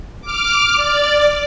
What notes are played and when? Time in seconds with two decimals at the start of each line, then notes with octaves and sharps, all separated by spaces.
0.22 D6 F6
0.76 D5